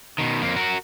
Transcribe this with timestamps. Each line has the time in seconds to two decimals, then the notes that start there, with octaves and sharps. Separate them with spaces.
0.18 B2 D#3
0.42 F2 A#3
0.56 F#4 A#4